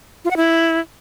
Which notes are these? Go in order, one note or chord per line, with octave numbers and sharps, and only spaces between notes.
F4
F#5
E4